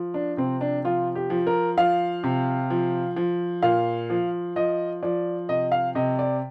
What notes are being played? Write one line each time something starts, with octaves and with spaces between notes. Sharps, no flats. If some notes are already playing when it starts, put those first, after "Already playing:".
Already playing: F3
D4
C3 C4
D4
F3 F4
G4
F3
A#4
F3 F5
C3
F3
F3
A#2 F5
F3
F3 D#5
F3 D5
C3 D#5
F5
C3 D#5
D5